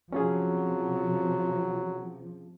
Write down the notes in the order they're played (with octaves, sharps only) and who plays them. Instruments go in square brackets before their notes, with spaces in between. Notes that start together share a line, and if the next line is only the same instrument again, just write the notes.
[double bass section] C3 F3 [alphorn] F#3 [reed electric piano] C#4 F4 G#4